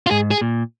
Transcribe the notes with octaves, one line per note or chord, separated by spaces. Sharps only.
F4
G#2 G#4
G#4
A#2